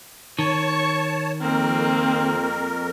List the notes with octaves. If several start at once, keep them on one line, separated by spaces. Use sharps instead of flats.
D#3 C#5 A5 C#6
F2 A#3 C4 A#4